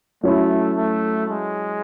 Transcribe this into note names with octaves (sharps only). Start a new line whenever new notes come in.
F#3 A3 C#4 E4
A3
G#3